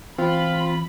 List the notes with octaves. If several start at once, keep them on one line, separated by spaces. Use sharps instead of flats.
E3 C4 F4 B5